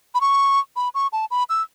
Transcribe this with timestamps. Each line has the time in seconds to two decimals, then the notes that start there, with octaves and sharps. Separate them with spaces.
0.15 B5
0.21 C#6
0.76 B5
0.95 C#6
1.13 A5
1.31 B5
1.49 E6